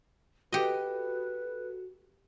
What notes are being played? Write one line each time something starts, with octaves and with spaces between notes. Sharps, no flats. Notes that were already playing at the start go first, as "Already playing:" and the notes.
F#4 G4 A4 B4 D#5